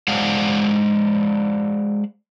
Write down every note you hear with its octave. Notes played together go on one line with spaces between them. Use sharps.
G#3 C5 D5 F5 F#5